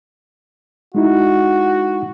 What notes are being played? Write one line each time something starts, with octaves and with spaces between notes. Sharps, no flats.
G#3 D#4 E4 F#4